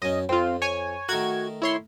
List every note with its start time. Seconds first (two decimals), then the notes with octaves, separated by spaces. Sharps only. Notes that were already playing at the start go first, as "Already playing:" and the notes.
0.02 F#2 C#4 D#5
0.29 F2 C4 F4
0.62 C#5 G#5
1.09 D#3 A3 F#4 A#4 G#6
1.62 E4 C#5 C6